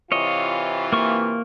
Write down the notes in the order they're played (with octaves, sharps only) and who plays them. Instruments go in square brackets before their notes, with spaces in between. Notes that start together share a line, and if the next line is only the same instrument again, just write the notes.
[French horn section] C3 E3 F4 [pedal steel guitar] C#5 D#5
[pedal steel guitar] A#3 C#6